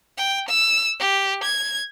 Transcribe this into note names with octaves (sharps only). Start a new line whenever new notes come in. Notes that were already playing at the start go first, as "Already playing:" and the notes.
G5
E6
G4
G#6